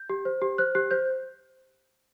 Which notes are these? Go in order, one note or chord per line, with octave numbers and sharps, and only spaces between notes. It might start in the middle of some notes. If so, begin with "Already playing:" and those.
Already playing: G6
G4
C5
G4
C5 F#6
G4 F#6
C5 G6